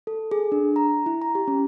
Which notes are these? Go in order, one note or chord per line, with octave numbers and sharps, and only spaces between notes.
A4
G#4
D4
A#5
E4
A#5
G4
C#4